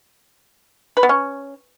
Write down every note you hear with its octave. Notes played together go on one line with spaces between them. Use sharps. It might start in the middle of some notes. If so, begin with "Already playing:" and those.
B4
B3
C#4